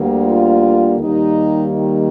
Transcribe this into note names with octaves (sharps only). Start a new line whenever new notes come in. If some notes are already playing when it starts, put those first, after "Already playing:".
Already playing: D2 D3 G3 A#3
F4
D#2 D#3 G3 A#3 D#4
D#4